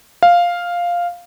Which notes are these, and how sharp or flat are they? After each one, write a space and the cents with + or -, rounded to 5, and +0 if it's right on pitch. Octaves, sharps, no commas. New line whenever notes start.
F5 +0